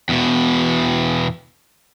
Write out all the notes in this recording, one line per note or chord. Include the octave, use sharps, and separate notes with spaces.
E2 B2